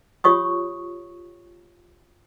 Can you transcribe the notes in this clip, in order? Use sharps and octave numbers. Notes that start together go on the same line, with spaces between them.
F4 G4 C#5 C#6 D#6